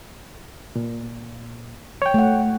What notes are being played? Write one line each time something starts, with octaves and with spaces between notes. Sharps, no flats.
A#2
C#5 G5
A3 F#5